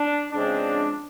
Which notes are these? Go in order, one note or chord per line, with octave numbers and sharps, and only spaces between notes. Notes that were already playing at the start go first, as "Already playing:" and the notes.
Already playing: D4
C#3 F3 G#3 C4 D4